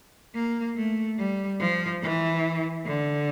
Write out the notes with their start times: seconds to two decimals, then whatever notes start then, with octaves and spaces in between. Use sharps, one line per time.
0.35 A#3
0.76 A3
1.18 G3
1.60 F3
2.02 E3
2.86 D3